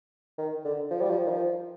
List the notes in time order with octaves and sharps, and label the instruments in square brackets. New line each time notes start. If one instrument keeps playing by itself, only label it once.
[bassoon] D#3
D3
F3
G3
F3
D#3
F3